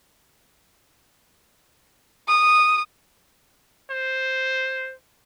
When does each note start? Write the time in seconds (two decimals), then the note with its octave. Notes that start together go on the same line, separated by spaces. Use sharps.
2.28 D#6
3.91 C5